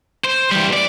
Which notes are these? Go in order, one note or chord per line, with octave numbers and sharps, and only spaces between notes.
C5
E3 G3
D5